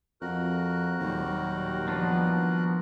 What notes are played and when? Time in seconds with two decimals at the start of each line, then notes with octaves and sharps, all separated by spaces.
0.21 F2 F#4 A#4 F#6
0.99 D#2 A#2 F#3 G3
1.88 F3 B3 D4